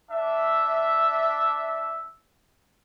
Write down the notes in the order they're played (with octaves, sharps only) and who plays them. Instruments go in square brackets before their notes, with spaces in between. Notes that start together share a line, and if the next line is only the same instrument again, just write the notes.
[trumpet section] D4 E5